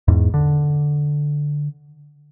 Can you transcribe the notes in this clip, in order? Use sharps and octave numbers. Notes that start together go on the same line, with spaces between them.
E2 G#2
D3